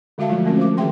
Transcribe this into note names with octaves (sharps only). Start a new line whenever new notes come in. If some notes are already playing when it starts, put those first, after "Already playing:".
D3 G#3 F#4 E5 F5 A5
F3 F#3 G#3 A3 F4
G#3 A3 C4 C#4 F#4 A#4
C5 D6
D#3 G#4 C5 E5 G5 C6